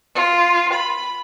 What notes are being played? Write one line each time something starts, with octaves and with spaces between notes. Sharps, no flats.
F4
B5